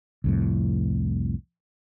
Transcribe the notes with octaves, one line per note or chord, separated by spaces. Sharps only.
C2 F2 A2